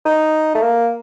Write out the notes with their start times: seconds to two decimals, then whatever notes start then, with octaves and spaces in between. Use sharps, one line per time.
0.06 D#4
0.55 A3
0.62 A#3